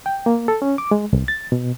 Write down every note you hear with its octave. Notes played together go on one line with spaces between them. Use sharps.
G5
A#3
A4
C#4
D6
G#3
C2
A6
B2